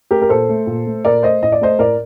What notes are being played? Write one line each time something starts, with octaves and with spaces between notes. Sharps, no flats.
A3 G4 A#4
A#4
A#2 A4 C5
A3
A#2
A3
A#2 A#4 D5
A3 C5 D#5
A2 D#5
D5
A3 C5 D#5
A2 A#4 D5